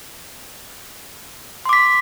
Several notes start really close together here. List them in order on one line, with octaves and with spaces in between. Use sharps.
C6 D6 B6